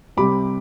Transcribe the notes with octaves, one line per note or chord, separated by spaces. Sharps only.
C2 C3 G3 B5 D6